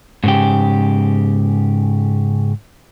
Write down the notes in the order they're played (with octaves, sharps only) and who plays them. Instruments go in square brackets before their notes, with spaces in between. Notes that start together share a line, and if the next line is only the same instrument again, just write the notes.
[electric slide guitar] G#2 C#3 G4